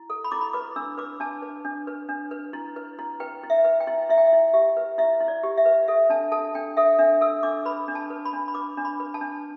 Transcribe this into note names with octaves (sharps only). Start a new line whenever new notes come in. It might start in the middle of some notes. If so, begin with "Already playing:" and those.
Already playing: E4
A4
B5
E4 D6
B5
B4 D6
D4 E6
B4 D6
D4 A5
B4
D4
B4
D4
B4
E4
B4
E4
B4 G5
E4
E5
B4
G5
E4
E4 E5
G5
E5
E4
G4 E5
B4
E4 E5
E4
D5
G4
E5
B4
A4 E5
D4 A5
A4 A5
D4 G5
A4 E5
D4 E5
A4 E6
D4 D6
B4 B5
D4
A5
B4
B5
D4
B5
B4 D6
D4
B5
B4
A5
D4